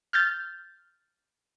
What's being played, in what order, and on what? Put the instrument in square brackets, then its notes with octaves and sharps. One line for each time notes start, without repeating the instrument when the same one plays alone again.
[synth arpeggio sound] F6 G6 A6